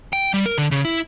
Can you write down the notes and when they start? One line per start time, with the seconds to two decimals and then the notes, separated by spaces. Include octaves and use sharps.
0.13 G5
0.34 G3
0.46 A#4
0.58 D3
0.71 C#3
0.85 E4